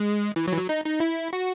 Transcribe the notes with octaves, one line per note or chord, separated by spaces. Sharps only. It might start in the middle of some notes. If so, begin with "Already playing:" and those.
Already playing: G#3
E3
F#3
E3
F#3
D#4
D#4
E4
F#4